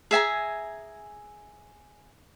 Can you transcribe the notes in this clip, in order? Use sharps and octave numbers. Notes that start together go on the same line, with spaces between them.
G#4 E5 G#5 A#5